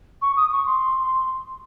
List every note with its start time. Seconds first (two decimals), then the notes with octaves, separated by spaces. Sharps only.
0.22 C#6
0.37 D#6
0.52 C#6
0.66 C6